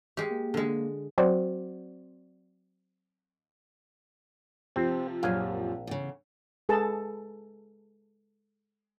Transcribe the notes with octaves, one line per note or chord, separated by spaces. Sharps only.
G#3 G4
A#3
D3 G#3
F#3 C4 F#4 C5 D5
C3 F3 C4
A#1 F#2 A#2 F5 G#5
E2 C#3
G#3 G#4 A4 B4 A5